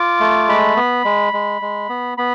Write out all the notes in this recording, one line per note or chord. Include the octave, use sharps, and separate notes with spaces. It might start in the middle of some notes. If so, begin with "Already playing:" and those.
Already playing: F4 D6
A3
G#3 B5
B3
G#3
G#3
G#3
B3
B3 B5